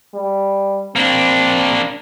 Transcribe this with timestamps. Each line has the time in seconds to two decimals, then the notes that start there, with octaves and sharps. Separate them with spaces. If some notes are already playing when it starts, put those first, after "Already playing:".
0.14 G3
0.96 A#3 C4 D4